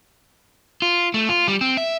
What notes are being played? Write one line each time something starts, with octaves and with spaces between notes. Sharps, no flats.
F4
A3
F4
G3
C4
E5